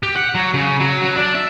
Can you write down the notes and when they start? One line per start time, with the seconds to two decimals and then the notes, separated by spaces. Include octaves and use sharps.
0.03 G4
0.16 F#5
0.35 F#3
0.54 C#3
0.80 F#3
1.03 F#3
1.16 D4
1.35 E5